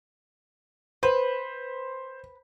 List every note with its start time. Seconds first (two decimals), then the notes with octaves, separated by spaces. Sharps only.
1.03 B4 C5